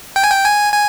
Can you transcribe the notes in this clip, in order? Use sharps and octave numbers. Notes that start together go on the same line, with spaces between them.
G5
G#5
G5
G#5
G#5